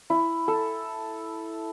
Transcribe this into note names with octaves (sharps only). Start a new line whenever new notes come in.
E4
A4